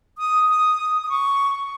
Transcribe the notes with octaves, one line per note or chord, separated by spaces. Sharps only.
D#6
D#6
D#6
C#6